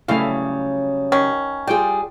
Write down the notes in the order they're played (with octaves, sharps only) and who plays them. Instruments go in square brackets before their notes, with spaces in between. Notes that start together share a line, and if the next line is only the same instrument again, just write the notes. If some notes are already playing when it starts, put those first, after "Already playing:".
[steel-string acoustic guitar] C#3 F#3 G3 [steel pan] A3 E4 F5
[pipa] D#3 C#4
[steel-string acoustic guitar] G3 G#4 [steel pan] F4 G5